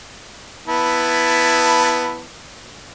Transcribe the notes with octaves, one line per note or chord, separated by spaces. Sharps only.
B3 E4 A5